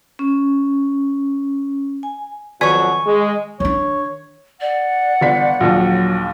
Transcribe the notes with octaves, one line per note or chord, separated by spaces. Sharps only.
C#4
G#5
F2 B2 D#3 F#3 D5 G#5 C#6
G#3
D#3 D4 C#5
D5 F#5
G1 B6
A#1 D#2 F#3